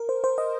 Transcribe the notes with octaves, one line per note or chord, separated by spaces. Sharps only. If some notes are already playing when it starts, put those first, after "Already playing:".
Already playing: A#4
C5
C5
D#5